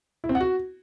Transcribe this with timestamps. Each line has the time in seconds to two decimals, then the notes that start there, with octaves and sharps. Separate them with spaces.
0.24 E4
0.29 C4
0.35 F#5
0.41 F#4